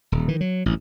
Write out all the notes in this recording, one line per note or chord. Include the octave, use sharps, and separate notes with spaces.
D#1
D#3 E3
F#3
A1 G2